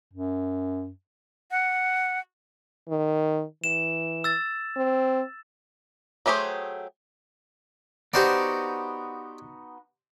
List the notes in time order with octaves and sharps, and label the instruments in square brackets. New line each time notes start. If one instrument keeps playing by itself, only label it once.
[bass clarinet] F#2
[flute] F#5
[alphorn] D#3
[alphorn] E3 [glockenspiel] E7
[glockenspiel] E6 A6
[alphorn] C4
[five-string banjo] F#3 A3 G4 G#4 C5
[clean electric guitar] B3 D#4 F#4 [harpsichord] G4 C5 D5